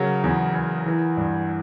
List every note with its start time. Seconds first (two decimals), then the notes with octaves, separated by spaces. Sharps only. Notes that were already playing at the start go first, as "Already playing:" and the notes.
Already playing: C#3 F#3 A#4
0.24 E2
0.54 E2
0.86 E3
1.17 G2